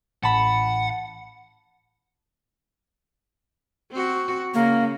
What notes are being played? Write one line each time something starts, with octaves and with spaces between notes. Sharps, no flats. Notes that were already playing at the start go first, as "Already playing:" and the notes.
A1 F#5 A5 B5
C4 F#4
C#3 A#3